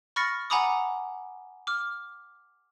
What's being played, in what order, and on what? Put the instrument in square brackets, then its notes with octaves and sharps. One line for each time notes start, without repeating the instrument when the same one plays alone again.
[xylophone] B5 C#6 F6 A6 A#6 C#7
F#5 G#5 A#5 B5 D6 D#6
D6 F6